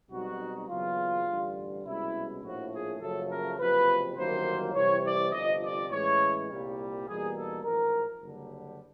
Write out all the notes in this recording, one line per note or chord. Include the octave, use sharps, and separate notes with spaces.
B1 B2 G3 C4 D#4 F#4
F#1 E2 C#3 F#3 B3 F4
A1 G2 D3 G3
C2 B2 G#3 C#4 E4
A#1 A2 F3 F#4
G#4
F#1 F#2 C#3 F3 A3 A4
A#4
F#1 F2 C3 F3 B4
G1 F#2 D#3 F#3 A#3 C5
C2 C3 E3 C#5
D5
G1 F2 C3 D#5
D5
A2 E3 G#3 C#4 E4 C#5
C2 A#2 G3
E2 B2 G3 A#3 D#4 G#4
A4
A1 G#2 F3 A#4
F#1 F#2 D3 G3